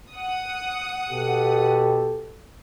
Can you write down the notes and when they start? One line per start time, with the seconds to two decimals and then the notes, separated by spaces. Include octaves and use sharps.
0.13 F#5 D#6
1.11 B2 G4 A4